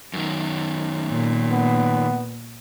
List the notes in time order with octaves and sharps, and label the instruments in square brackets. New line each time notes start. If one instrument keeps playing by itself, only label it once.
[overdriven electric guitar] F#2 D#3
[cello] A#2
[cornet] B3